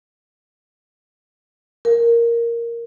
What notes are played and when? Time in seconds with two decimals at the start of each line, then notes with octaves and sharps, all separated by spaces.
1.85 A#4